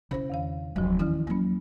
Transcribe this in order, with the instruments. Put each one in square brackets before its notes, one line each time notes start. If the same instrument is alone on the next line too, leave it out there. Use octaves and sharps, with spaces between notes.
[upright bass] C#3 E4 [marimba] C#4 C5
[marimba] E2 D#3 F5
[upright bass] F1 F#3 [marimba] D#2 F3
[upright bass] D#3 C#4 [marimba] E3 E4
[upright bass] F#3 F4 [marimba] A#3 C#4